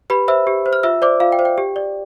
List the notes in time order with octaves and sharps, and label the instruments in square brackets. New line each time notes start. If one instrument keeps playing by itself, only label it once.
[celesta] G4 B4 B5
C5 E5 E6
G4
C5
F6
F4 E5 E6
C5 D5 D6
F4 F5
G5
C5
G5
G4
D5